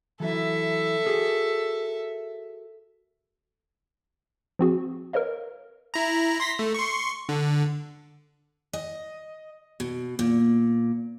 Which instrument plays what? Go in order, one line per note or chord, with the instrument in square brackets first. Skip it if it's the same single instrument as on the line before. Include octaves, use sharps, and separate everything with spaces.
[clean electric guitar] E3 F#3 E4 [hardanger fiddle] A4 E5
[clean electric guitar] F#4 G#4 A#4
[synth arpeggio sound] F3 C4 F#4 G#4
A#4 B4 C#5 D#5 F5
[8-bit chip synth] E4 A#5
C6 A#6 B6
A3
C6 C#6
D3
[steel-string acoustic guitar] D#5
B2
A#2